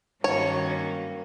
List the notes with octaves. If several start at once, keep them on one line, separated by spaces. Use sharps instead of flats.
G2 D#3 F#3 A#3 C#4 C#5